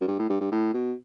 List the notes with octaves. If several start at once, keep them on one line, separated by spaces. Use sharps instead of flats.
F#2
G2
A2
G2
G2
A2
B2